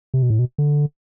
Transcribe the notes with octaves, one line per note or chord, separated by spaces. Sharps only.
C3
B2
A2
B2
D3